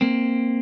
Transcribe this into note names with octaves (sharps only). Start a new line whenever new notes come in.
A#3 C4